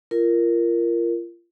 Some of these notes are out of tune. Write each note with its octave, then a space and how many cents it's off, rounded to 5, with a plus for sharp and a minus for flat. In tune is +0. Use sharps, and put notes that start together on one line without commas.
F4 -30 A#4 +0